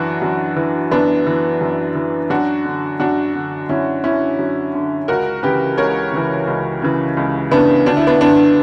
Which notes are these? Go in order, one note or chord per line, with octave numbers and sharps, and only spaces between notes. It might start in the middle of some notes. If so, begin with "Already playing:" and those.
Already playing: F#2 E3 D4 F#4
F#2
E3
F#2 B3 D4
E3
F#2
E3
F#2 D4 F#4
D3
F#2 D4 F#4
D3
F#2 C#4 E4
D3 C#4 E4
F#2
D3
C#2 F#4 A#4
C#3 E3 G4 B4
C#2 A#4 C#5
C#3 E3
C#2
C#3 E3
C#2
C#3 E3 B3 D4
D2 D4
E4
B3 D4
D3 B3 D4